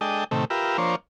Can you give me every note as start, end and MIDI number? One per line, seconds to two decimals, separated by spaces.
0.01 0.24 56
0.01 0.24 62
0.01 0.24 69
0.01 0.24 75
0.01 0.24 79
0.31 0.45 45
0.31 0.45 48
0.31 0.45 51
0.31 0.45 57
0.50 0.77 65
0.50 0.77 67
0.50 0.77 70
0.50 0.77 71
0.50 0.77 76
0.78 0.96 53
0.78 0.96 58
0.78 0.96 62
0.78 0.96 72
0.78 0.96 73